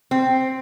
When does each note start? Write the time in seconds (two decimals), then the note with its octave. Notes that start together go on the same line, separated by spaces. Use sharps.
0.11 C4